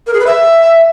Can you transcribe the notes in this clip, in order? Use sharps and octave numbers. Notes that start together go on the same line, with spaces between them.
A#4
G#4
B4
E5